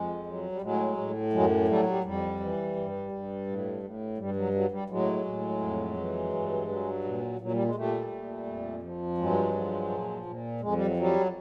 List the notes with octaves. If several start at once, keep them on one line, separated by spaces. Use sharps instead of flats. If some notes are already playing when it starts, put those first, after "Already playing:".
Already playing: F2 G#3
F#3
G3
A2 F#3 G#3
A2
F#2 F#3 G#3
F#3 G3 A3
G3
F2 G3
E3
G2
G2
A2
A2
G2 G3
F#3
F#3
G3
A2 F#3 G#3
A2
F2
E3
G2
F#3
A#2
A#2 F#3
G3
G#3
A#2 G3 A3
A#2
F2
F3
G2 F#3 G#3
F3
A#2
A#2
F2 G#3
G3
F#3
F#3 G3